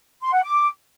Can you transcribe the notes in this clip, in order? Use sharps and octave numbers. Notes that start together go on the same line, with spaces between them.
C6
F#5
D6